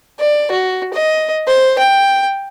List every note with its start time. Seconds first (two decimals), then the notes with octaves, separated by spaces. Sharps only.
0.19 D5
0.51 F#4
0.93 D#5
1.47 C5
1.78 G5